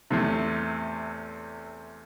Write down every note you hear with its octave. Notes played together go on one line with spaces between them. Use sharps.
E2 A2 C3